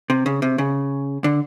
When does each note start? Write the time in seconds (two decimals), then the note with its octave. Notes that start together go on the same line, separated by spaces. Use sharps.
0.10 C3
0.26 C#3
0.42 C3
0.58 C#3
1.24 D3